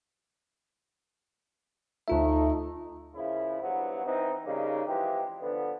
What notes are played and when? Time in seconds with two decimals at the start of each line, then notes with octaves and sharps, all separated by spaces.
2.08 D2 A3 D#4 F4 E5
3.15 A#2 C#3 F3 E4
3.62 E2 G2 F#3 B3 C5
4.05 E3 C4 D#4
4.45 C#3 G3 A#3 D#4
4.87 E3 F3 G#3 G4
5.41 D3 F3 B3